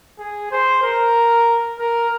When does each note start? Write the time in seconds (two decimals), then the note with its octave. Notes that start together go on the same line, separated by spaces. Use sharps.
0.19 G#4
0.51 C5
0.83 A#4
1.78 A#4